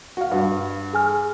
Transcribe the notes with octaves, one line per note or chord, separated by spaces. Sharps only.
F#4 F5
G2
G#4 G#5 F6